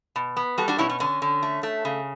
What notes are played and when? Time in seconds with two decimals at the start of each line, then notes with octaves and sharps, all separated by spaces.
0.16 B2
0.37 B3
0.58 G3 F#4 A4
0.68 D4 F#4
0.78 B2 C#4 E4
0.89 C#4
1.00 D3 C#4
1.22 D3
1.43 A3
1.63 A3
1.85 C#3